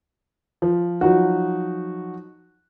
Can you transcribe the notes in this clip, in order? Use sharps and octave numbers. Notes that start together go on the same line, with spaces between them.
F3
F3 F#3 D#4 F#4